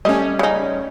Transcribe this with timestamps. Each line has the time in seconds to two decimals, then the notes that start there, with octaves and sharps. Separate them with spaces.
0.05 G3 A3 C#4 D#5
0.39 C#3 D#4